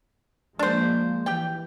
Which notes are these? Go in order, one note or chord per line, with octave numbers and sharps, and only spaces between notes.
F3 G#3 A#3 D4 C5
E3 G4 G5